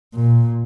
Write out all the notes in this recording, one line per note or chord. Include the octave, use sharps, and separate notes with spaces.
A#2